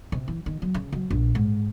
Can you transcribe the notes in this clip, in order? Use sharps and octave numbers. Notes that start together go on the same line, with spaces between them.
C3
E3
D#3
F#3
C#3
F#3
A#1
G#2